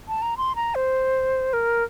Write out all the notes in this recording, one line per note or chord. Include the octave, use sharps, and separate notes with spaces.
A5
A#5
C6
A#5
C5
A#4